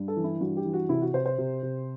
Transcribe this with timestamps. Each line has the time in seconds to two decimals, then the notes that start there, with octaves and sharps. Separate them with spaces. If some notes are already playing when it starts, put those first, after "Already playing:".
Already playing: G2
0.08 A4
0.16 E3
0.24 E4
0.41 G2 F#4
0.57 G4
0.65 E3
0.73 F#4
0.89 C3 E4
1.01 F#4
1.13 C3 C5
1.26 C5
1.38 C3
1.63 C3